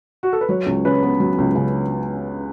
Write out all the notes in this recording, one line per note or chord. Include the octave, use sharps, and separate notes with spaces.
F#4
A4
B4
F#3 C#5
C#2
C#3 B4
B3
F#3
C#2
C#3